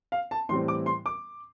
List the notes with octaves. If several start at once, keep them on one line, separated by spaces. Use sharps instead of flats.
F5
A5
A2 E3 G3 C4 C6
D6
C6
D6